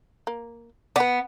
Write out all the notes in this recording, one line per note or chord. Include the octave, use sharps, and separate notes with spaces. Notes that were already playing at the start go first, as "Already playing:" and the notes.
A#3
B3 B4 D5